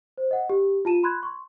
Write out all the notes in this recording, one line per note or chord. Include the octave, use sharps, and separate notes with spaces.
C5
D#5 F#5
G4
F4 A5 D#7 E7
B5 C6 F#6 G#6
C6 C#6